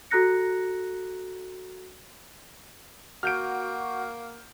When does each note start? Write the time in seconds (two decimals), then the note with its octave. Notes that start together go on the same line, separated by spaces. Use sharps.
0.11 F#4 A4 A#5 F#6 A#6 C#7
3.23 A#3 F#4 F6 G6 D7